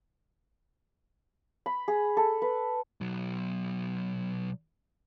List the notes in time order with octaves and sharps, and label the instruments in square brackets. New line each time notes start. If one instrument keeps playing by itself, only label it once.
[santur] B5
G#4
A4
B4
[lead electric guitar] B1 F#3